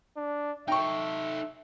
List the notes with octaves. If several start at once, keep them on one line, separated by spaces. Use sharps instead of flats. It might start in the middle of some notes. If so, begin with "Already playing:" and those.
D4
D#4 A4 E5 G5 C#6